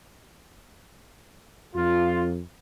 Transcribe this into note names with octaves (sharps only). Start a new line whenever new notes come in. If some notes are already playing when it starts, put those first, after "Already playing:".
F2 F4